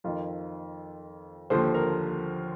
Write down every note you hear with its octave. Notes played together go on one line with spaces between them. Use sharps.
F2 D#3 F4
D#2 D3 F3 C5
A#4